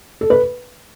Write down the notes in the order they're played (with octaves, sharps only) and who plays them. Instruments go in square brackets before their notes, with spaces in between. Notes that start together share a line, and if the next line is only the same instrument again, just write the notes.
[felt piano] A4
B4